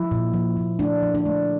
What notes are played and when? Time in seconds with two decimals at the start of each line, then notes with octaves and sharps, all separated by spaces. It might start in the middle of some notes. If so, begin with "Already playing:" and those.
Already playing: F3 E4
0.11 A#2
0.34 F3
0.57 A#2
0.79 A3 D4
1.02 F3
1.15 D4
1.26 A3